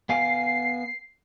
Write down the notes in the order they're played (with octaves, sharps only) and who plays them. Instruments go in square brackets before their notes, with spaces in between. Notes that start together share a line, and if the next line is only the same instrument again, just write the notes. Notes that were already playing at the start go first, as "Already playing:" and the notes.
[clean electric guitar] B3 F5 G#5 [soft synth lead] C7